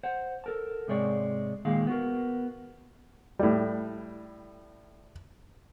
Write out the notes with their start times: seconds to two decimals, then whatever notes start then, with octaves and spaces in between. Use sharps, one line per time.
0.03 C5 F#5
0.44 A4 A#4 A5
0.88 G#2 C3 G#3 C#5 D5
1.65 D#2 A#2 D#3 G#3 F5
1.87 B3 F#4 A#4
3.39 A2 G3